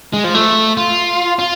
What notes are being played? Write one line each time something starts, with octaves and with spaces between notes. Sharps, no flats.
G#3
F3
A3
F4
F4